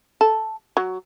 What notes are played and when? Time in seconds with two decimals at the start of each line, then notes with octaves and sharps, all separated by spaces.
0.21 A4
0.77 F#3